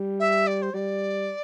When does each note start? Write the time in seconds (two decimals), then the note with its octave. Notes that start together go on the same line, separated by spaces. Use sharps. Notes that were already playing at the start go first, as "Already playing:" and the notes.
Already playing: G3
0.19 E5
0.47 D5
0.62 C5
0.73 G3 D5